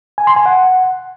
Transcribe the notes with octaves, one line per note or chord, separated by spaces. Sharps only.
G#5
C6
G#5
F#5